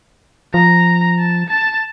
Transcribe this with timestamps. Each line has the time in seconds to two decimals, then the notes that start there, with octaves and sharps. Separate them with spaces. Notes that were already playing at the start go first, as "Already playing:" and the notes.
0.54 F3 A#5
1.19 A5
1.48 A5 A6